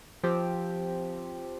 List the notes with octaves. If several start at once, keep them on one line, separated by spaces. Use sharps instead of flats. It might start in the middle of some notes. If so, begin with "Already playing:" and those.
F3 C4 G4